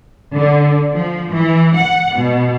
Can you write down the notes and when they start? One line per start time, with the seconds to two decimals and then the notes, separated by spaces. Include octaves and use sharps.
0.35 D3
0.94 F3
1.33 E3
1.78 F#5
2.18 B2